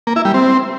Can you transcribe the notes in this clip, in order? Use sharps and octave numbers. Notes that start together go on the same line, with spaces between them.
A#3
E4
G3
C4